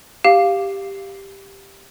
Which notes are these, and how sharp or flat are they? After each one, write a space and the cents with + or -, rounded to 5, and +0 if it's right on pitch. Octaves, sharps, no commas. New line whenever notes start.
G4 +0 F5 +0